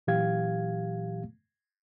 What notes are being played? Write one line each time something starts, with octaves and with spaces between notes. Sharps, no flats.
A#2 E3 F#3 G4 F5 G#6